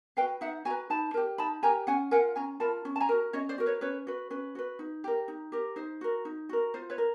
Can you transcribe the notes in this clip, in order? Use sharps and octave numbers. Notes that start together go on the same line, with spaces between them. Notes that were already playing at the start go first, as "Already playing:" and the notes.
F#4 B4 F5 G5
D#4 E5 F#5
F#4 B4 G#5 A#5
D#4 A5 B5
G4 A#4
D#4 A5 B5
G4 A#4 G#5 A#5
C#4 F#5 G#5
F4 A#4 F#5 G#5
C#4 G#5 A#5
F4 A#4 A5 B5
C#4
A5
G#5 A#5
F#4 A#4
C#4 C#5 D#5
C5 D5
F#4 A#4
B4 C#5
C#4 B4 C#5
F#4 B4
C#4 B4
F#4 B4
D#4
G4 A#4
D#4
G4 A#4
D#4 C5
F#4 A#4
D#4
F#4 A#4
F4 C5
B4 C#5
A#4